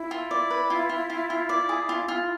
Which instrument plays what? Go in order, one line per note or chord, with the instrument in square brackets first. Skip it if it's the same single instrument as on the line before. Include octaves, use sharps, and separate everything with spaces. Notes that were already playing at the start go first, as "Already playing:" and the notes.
Already playing: [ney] E4
[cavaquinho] F4
D5
B4
F4
F4
F4
F4
D5
G#4
F4
F4